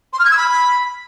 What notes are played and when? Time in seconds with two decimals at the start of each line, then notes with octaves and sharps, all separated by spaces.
0.13 C6
0.19 F6
0.25 G#6
0.31 E6
0.37 B5